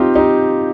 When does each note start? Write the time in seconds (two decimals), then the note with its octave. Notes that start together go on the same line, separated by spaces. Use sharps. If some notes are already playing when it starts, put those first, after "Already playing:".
Already playing: C4 D#4 F4 G4
0.15 D#4 G4